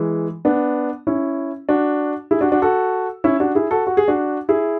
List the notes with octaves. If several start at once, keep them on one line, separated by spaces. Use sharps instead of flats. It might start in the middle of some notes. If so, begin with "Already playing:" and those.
Already playing: E3 G#3
B3 D4
C#4 E4
D4 F#4
E4 G#4
D4 F#4
D4 F#4
F#4 A4
C#4 E4
D4 F#4
E4 G#4
F#4 A4
F#4
G#4
D4 F#4
E4 G#4